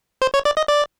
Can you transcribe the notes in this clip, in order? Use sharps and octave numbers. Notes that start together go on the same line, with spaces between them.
C5
C#5
D5
D#5
D5